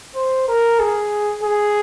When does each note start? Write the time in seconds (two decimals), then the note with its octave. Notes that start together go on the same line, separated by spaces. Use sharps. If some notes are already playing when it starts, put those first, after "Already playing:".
0.15 C5
0.48 A#4
0.79 G#4
1.43 G#4